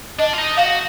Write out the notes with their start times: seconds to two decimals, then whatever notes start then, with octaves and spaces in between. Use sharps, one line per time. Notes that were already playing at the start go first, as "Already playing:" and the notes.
0.19 D4 D#5
0.33 F4
0.38 D#4
0.57 F#4 F5